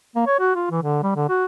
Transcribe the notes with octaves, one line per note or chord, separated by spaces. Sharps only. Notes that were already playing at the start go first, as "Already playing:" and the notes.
A#3
C#5
F#4
F4
E3
D3
G3
D3
F#4